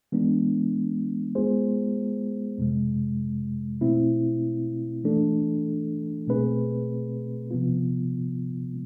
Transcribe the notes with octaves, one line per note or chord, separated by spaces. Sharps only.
E3 G#3 B3 D4
G#3 B3 F4 G#4 C5
F2 C3 G#3
B2 A3 C4 E4
E3 A3 D4 A4
B2 A3 C4 G#4 B4
C3 F3 B3 F4